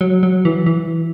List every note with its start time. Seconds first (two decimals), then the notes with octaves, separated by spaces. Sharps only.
0.01 F#3
0.23 F#3
0.45 E3
0.66 E3